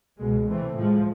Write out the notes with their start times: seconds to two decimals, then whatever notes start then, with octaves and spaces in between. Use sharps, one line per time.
0.18 C#2 B2 G#3
0.46 C3 E3 A3 C4
0.74 A2 F3 G#3